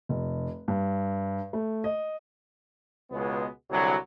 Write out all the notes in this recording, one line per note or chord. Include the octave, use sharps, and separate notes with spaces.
F1
G2
A3
D#5
C#2 B2 G#3 B3
C2 D3 F#3